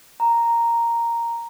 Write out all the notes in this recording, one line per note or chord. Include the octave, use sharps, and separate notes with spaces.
A#5